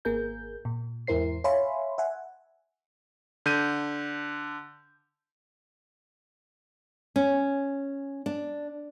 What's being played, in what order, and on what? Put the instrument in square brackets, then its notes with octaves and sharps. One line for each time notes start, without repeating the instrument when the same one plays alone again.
[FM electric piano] G#1 A#3 G#4 A#4 G6
A#2
E2 G#2 E4 A#4 C5 C7
C#5 E5 F5 G#5 B5 C6
E5 F#5 G#5
[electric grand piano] D3 G6 D#7
[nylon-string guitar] C#4
D4